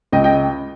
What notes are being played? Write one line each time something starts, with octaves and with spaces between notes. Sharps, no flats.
C#2 D#5 G5
D#5 G5